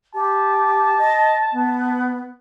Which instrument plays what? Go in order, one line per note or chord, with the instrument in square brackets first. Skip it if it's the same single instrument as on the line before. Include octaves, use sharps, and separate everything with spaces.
[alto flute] G4 [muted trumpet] A5
[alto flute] D#5
B3